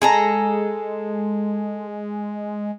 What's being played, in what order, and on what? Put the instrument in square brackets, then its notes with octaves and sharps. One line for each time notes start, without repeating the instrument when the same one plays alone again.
[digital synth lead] G#3 [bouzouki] G#4 A4 A#5